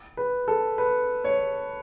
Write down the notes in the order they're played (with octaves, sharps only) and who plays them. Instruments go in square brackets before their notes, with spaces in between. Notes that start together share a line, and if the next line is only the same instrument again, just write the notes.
[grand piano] B4
A4
B4
C#5